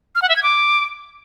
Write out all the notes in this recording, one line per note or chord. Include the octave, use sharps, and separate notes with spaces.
F6
F#5
E5
G#6
D6